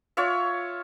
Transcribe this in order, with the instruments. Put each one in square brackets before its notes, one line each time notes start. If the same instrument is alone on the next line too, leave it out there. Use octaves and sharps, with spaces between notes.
[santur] F4 C#5 E5